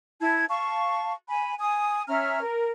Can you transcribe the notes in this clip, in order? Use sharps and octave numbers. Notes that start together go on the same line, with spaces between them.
E4 A5 G#6
F5 A5 C#6
G#5 B5
G#5 D#6
C#4 E5 A#5 F6
A#4